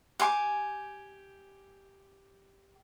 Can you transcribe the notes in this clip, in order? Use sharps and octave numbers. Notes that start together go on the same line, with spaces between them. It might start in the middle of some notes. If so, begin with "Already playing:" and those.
G4 G#5 C6 D6